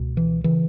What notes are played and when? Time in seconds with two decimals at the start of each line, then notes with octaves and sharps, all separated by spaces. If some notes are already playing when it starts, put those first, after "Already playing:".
Already playing: C#2 B2
0.17 E3
0.44 C#3 E3